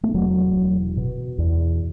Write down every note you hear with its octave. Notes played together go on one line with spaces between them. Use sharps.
A3
E1 F#3
E1
B2
E2